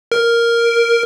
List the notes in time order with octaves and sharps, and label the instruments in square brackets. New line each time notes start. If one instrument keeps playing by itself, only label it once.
[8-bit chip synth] A#4